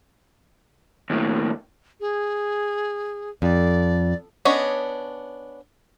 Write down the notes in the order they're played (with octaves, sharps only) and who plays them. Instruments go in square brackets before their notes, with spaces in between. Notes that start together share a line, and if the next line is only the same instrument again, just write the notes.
[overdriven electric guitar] D#2 A2
[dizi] G#4
[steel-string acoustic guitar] F2 [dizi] D5
[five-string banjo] B3 C#4 D4 C#5 D#5